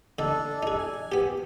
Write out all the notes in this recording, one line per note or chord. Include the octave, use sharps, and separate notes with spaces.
D3 D4 D#4 A4
D#4 G#4
G#5
B3 G4